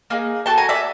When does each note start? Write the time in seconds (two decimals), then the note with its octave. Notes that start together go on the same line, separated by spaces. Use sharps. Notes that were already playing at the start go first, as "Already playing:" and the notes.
0.10 A#3 D#4 G#4
0.46 D4 F#4 A4 G5 A5
0.58 G#5 A#5
0.69 D5 E5